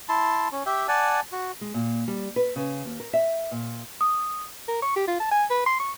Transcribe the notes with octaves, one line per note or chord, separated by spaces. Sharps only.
E4 A5 C6
C#4
G4 E5 G5
D5 F#5 G#5 A5
F#4
G#3
A#2
G3
B4
C#3
D#2
A#4
E5
A#2
D#6
A#4
C#6
G4
F4
A5
G#5
B4
C6
C#6